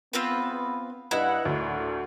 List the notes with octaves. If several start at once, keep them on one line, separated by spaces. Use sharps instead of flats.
B3 C4 F4 B4
G2 E4 B4 D#5 F#5
D2 A2 A3 A#3 D4